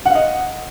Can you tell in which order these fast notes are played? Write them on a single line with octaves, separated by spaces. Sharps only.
F#5 F5 D#5